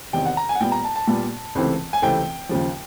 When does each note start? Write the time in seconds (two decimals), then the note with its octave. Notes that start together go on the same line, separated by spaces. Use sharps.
0.13 E2 C3 D#3 G5
0.26 F#5
0.37 A#5
0.49 G#5
0.55 F#5
0.61 A#2 G3 B3 G5
0.72 A#5
0.84 A5
0.96 A5
1.07 A#2 G3 B3
1.55 C#2 C3 E3 A3 C4
1.93 G#5
2.02 C#2 C3 E3 A3 C4 G5
2.49 D#2 C#3 F3